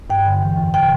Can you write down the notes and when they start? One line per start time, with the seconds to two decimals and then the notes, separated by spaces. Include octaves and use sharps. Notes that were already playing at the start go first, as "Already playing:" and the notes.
0.10 G2 G5
0.26 D3
0.42 E3
0.57 F2
0.74 C3 G5